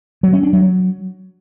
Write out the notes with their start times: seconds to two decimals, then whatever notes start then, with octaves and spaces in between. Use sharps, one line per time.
0.23 F#3
0.33 C#4
0.43 D4
0.53 F#3